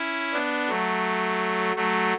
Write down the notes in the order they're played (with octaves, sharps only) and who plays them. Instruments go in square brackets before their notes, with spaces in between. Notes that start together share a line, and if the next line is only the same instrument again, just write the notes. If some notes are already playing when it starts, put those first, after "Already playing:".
Already playing: [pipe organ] C#4 E4
B3 D4
F#3 A3
F#3 A3